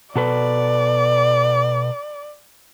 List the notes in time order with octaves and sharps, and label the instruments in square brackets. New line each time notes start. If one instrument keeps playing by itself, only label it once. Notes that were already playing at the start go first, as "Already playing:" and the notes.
[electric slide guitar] B2 A4 B4 [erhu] D5